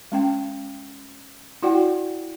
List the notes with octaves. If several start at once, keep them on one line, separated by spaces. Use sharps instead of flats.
G#3 C#4 G5
E4 F#4 D5 F#5 G5